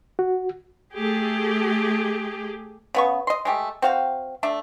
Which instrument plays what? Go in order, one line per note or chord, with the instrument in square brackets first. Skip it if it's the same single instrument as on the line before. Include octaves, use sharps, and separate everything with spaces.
[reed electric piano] F#4
[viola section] A3 G4 G#4
[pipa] C#3 B3 C#6
D#5 C6
G#3 A3 G4
C4 F#4 F5 G5
A3 D4 E5